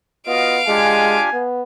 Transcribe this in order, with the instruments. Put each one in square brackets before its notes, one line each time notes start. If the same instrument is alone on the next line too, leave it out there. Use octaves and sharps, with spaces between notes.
[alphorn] B3 [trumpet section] F4 F#4 D#5 [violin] F5 D7
[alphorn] G#3 [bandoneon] D4 F4 G4 [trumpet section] G#5
[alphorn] B3